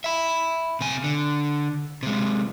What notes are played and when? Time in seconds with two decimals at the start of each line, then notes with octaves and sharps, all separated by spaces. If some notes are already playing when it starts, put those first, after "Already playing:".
0.04 E5 B5
0.81 C3 G#5
1.04 D3
2.03 C3 G#3